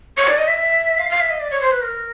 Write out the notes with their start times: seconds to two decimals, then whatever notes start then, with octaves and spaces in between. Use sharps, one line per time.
0.17 C#5
0.28 D5
0.38 D#5
0.48 E5
0.99 F5
1.10 F5
1.20 E5
1.30 D#5
1.40 D5
1.51 C#5
1.61 C5
1.71 B4
1.82 A#4